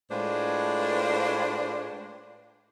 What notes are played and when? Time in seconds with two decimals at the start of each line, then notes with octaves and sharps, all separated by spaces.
0.11 A2 G#3 D4 F4 B4 C5